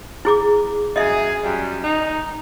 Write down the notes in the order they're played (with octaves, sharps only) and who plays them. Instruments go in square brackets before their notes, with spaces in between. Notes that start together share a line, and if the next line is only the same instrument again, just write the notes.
[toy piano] E4 G#4 D6
[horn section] F#2 G#4 [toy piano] D#5 E5
[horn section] F#2 G3
D#4